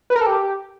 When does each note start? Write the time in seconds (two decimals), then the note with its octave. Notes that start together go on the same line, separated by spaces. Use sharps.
0.10 B4
0.16 A#4
0.21 A4
0.27 G4